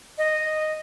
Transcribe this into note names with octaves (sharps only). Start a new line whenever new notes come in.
D#5